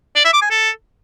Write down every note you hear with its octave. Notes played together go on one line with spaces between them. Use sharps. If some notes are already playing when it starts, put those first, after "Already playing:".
D5
E5
D6
G#5
A4